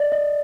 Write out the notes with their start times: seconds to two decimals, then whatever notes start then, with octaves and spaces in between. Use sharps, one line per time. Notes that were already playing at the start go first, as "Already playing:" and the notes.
Already playing: D5 D#5
0.12 D#5